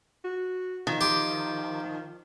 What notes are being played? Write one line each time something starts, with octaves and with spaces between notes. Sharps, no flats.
F#4
D#3 F3
G4 C6